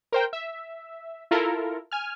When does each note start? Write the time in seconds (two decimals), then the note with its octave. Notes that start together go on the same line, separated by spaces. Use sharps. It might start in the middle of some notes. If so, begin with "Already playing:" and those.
0.12 A#4 C5 G5
0.33 E5
1.31 E4 F4 A4 A#4
1.91 G#5 F6